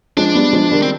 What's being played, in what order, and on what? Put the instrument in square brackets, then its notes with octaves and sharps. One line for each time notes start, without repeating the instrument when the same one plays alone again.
[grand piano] F3 G#3 [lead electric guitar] D4
[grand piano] G3 B3
F3 G#3
D#3 G3
[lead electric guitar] C4